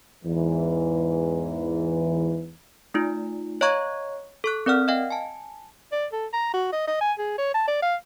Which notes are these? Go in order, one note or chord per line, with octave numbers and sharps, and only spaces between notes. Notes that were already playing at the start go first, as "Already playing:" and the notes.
E2 G#2 E3
A3 D#4 F4
C#5 D#5 F5 A#5 C#6 G#6
A4 C#6 F#6
C4 A#4 D5 F#5 F6
D#5 F5 G5
G#5 A5
D5
A4
A#5
F#4
D#5
D#5
G#5
G#4
C#5
A5
D5
F5